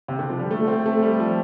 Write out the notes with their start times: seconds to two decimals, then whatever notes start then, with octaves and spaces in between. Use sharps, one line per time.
0.08 C3
0.19 D3
0.30 F3
0.39 G3
0.51 A3
0.67 C4
0.86 A3
1.03 G3
1.19 F3